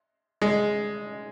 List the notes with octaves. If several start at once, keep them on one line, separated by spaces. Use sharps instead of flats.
G#3